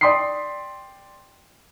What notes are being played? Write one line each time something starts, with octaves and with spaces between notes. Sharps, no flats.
D5 G5 C6 D#6 B6 C7